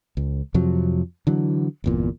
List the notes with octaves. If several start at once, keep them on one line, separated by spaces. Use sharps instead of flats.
C#2
F2 C3 F3 F#3
D3 E3 F#3
G1 E2 A#2